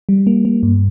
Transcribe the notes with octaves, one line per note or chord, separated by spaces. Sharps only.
G3
A#3
A#3
G2